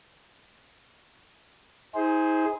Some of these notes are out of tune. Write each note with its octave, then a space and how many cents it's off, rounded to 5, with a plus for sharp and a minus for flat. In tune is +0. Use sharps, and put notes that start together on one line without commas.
D#4 +45 G#4 +0 C5 -5